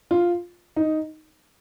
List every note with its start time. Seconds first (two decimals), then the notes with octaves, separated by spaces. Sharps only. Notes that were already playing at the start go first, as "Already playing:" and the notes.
0.11 F4
0.76 D#4